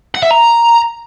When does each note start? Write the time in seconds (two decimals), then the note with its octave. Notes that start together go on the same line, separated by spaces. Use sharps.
0.15 F#5
0.23 E5
0.31 A#5